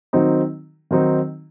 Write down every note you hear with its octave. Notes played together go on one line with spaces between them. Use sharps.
D#3 F#3 C4 D#4
D#3 F#3 C4 D#4